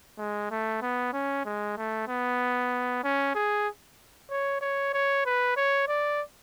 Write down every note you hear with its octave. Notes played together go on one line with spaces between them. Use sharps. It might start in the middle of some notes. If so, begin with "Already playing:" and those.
G#3
A3
B3
C#4
G#3
A3
B3
C#4
G#4
C#5
C#5
C#5
B4
C#5
D5